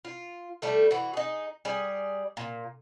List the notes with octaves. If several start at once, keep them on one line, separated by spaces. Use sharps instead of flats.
F4
G3 A3 A4
E3 F#4
D#4 G#4
G3 G#4
A#2